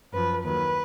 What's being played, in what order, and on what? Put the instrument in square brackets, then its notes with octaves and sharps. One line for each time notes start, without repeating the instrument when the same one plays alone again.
[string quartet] F#2 F3 B4
D#2 D#3 F#3 B4